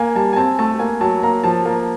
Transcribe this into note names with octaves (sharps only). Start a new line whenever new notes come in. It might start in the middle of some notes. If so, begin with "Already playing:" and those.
Already playing: A#3 G#5
G3 A5
G#5
C4 A5
A3 A5
A#3 G#5
F#3 A5
A#3 A#5
F3 A5
A#3